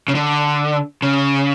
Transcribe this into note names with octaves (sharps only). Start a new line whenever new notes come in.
C#3
D3
C#3